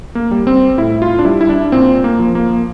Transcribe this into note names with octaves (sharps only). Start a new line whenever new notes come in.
A#3
G3
C4
A2 E4
F4
D4
G3 E4
E4
D4
A#2 C4
A#3
F3
A#3